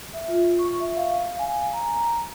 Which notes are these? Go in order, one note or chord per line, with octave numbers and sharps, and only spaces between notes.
E5
F4
C#6
E5
F5
G#5
A#5